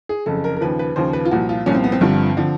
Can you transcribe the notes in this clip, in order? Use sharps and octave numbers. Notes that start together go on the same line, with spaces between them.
G#4
F#1 F2 C#3 A4
A#4
A#4
D#2 C#3 F3 B4
B4
D#2 C#3 F3 C5
B4
F4
C2 A#2 F3 F#4
F4
C2 A#2 F3 C#4
C4
B3
C4
G1 G2 D3 F3
D3 F3